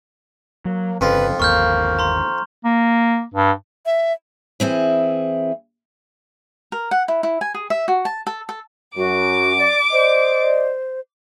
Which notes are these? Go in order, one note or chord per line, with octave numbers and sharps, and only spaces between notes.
F#3 A#3
G1 F2 C#3 F4 B4
G1 D#2 A#3 C#6 F6 G6
A#5 C6
A#3
G2
E5
E3 C4 E4 G#4
A#4
F#5
E4
E4
G#5
G#4
E5
F#4
A5
A4
A4
F#2 F#4 D6
D5
C5 D5 D#5